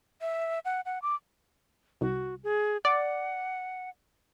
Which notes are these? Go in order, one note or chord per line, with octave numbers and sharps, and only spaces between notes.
E5
F#5
F#5
D6
C2 F#4
G#4
D5 F#5